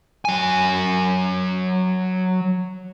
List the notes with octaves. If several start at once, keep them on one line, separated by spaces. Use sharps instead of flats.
F#3 G#5